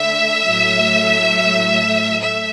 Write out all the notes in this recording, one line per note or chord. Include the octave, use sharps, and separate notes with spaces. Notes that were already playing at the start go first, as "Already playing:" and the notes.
Already playing: D3 A3 E5
A2 F#3 A3
A3 E5